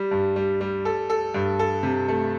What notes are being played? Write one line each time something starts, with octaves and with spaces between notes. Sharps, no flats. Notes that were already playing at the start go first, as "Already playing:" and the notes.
Already playing: G3
G2
G3
G3
A4
A4
G2
A4
C3
A3